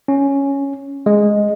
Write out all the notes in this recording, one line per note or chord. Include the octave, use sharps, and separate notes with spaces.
C#4
G#3